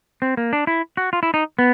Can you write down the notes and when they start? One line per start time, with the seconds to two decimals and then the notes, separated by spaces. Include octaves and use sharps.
0.22 C4
0.37 A#3
0.53 D4
0.67 E4
0.97 F#4
1.13 F4
1.23 E4
1.34 D#4
1.59 B3